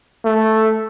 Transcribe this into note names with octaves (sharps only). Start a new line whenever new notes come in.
A3